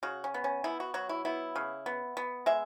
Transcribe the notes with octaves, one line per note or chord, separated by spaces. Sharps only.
C#3 F#4
C#4
B3
C#4
B3 E4
F#4
F#3 F#4
E4
B3 E4
C#3
B3
B3
G#3 E5